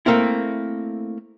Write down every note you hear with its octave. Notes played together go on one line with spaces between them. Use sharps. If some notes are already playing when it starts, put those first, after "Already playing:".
A3 A#3 C4 E4